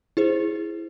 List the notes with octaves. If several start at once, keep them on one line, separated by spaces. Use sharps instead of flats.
E4 G#4 C5